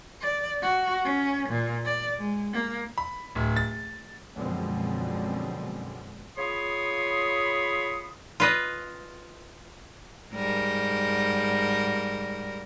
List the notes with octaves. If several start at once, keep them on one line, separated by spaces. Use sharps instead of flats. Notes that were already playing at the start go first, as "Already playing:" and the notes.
D5
F#4
C#4
A#2
D5
G#3
A#3
B5
D1
A6
F#2 B2 D3 F3 G#3 C4
F4 G#4 C#5 B5 C6 D#6
F4 B4 D#5
G#2 G3 A#4